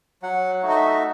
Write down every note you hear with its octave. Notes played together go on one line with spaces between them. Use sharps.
F#3 F#5
A3 D#4 F#4
D#5
E5